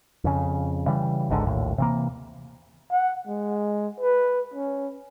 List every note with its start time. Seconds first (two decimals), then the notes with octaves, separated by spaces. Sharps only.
0.24 F2 C#3
0.87 C#3 E3 G3
1.29 G#1 C#2 G#2 D3
1.46 A#1 D#2 A2
1.78 C3 E3 A#3
2.91 F#5
3.27 G#3
4.00 B4
4.54 C#4